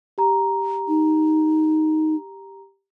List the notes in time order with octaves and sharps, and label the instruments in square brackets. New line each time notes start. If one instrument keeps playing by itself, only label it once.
[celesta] G4 A#5
[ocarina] D#4